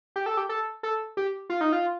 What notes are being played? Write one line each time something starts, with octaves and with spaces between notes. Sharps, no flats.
G4
A4
G4
A4
A4
G4
F4
D#4
F4